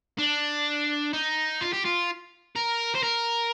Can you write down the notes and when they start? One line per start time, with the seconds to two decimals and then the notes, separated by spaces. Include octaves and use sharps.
0.19 D4
1.13 D#4
1.61 F4
1.73 G4
1.85 F4
2.56 A#4
2.95 C5
3.03 A#4